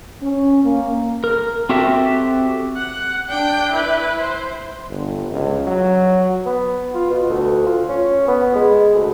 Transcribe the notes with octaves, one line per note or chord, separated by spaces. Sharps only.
C#4
A#3
A#4
C4 F#4 G4 A4 E5
F#5
D4 G5
E4 B4
C5
G1
C#2
F#3
B3
F4
B2
D2
F4
C#4
B3
G#3
D2